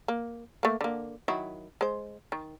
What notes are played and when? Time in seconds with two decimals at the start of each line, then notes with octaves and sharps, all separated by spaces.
0.08 A#3
0.63 A3 A#3
0.81 D3 A#3
1.28 D#3 F#3 E4
1.81 G#3 C5
2.32 D#3